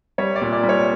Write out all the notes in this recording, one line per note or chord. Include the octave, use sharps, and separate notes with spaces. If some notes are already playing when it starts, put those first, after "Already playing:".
G3 C#5
D5
A#2
D5
G3
C#5